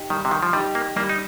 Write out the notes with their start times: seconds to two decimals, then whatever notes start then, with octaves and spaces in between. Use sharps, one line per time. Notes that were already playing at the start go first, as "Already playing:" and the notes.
Already playing: D#4 G4
0.10 D#3 G3
0.25 C3
0.31 D#3
0.43 F3
0.53 G3 D#4 G4
0.75 A#3
0.96 G3 A#3
1.09 D#4